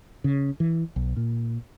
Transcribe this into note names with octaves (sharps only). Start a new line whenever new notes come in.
C#3
E3
B1
A#2